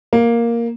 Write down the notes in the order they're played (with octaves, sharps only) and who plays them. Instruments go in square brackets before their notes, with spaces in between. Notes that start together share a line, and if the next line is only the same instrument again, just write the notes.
[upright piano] A#3